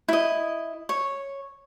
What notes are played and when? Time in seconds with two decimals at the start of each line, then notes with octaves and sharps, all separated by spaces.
0.08 E4 D#5
0.89 C#5